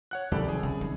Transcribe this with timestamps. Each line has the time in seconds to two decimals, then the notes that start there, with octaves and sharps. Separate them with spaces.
0.11 C#5 F#5 F#6
0.32 C2 B2 D#3 F3 G4 A4 D5
0.48 G#4
0.63 C#3
0.81 D#3